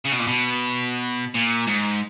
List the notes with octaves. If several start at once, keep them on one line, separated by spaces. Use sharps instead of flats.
C#3
B2
A#2
B2
A#2
G#2